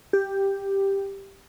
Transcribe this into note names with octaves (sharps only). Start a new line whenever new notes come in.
G4